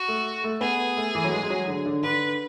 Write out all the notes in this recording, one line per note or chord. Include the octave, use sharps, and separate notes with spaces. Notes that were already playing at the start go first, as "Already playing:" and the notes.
Already playing: F#4
A3
A3
B3 G#4
A3
E3
F#3
G#3
G#3
F#3
D3
D3
D3 B4